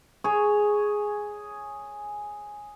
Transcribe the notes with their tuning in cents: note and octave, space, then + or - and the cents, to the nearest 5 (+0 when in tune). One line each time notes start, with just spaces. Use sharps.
G#4 +0 C#5 +0